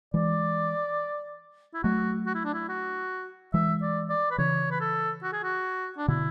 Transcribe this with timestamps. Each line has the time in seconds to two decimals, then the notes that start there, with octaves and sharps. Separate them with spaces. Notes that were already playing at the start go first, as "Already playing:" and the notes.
0.14 E3 G#3 D5
1.74 E4
1.83 F#3 A3 F#4
2.27 F#4
2.35 E4
2.45 D4
2.54 E4
2.69 F#4
3.54 E3 G#3 E5
3.82 D5
4.10 D5
4.31 B4
4.38 C#3 E3 C#5
4.71 B4
4.80 A4
5.23 F#4
5.33 G#4
5.43 F#4
5.98 D4
6.08 B2 D3 E4